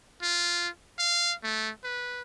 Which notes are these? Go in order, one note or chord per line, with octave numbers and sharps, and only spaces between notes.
F4
F5
A3
B4